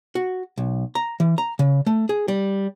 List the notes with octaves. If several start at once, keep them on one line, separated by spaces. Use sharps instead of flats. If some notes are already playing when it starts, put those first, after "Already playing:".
F#4
B1
A#5
E3
A#5
C#3
A3
G#4
G3